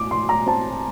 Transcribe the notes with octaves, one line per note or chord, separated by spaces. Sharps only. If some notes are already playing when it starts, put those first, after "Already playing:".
Already playing: A2 D6
A2 C6
A#5
C4 A5